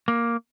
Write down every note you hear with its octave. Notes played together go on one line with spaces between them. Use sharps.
A#3